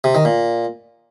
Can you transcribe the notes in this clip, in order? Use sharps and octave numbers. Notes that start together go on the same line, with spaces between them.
C3
D#3
A#2